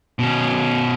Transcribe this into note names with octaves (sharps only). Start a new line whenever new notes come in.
B2 C#4